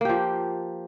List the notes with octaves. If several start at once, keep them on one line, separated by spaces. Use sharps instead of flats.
F3 A#3 G4